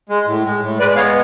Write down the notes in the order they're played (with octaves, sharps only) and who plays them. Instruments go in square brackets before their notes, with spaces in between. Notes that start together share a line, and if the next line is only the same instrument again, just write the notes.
[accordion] G#3
A2
G#3
A2
G#3 B4 D5
B3 C#5 F5